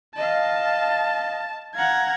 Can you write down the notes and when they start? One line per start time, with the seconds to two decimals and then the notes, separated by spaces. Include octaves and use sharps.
0.16 D#5 F5 A5
1.75 F5 F#5 A#5 G#6